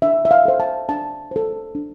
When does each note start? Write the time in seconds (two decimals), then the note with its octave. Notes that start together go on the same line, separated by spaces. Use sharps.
0.02 D4 E5
0.25 E5
0.31 F5
0.45 A4 C5
0.60 A5
0.89 D4 A5
1.31 A4 C5
1.75 D4